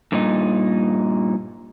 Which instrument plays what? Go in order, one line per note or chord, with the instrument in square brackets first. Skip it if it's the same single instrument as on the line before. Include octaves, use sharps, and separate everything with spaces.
[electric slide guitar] G2 A#2 D#4